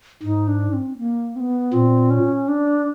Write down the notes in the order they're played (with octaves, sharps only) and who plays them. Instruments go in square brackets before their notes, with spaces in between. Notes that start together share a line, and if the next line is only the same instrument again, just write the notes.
[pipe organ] G#2 [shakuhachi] D#4
[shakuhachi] D4
C4
A#3
C4
B3
[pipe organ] A#2 [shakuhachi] C4
[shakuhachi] C#4
D4